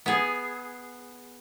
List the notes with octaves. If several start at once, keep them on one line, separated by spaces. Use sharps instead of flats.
B3 G#4